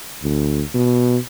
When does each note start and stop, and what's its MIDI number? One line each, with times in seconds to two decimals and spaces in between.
0.23 0.62 38
0.75 1.17 47